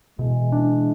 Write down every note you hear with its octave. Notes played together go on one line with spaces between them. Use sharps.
B2 E3 G#3
D4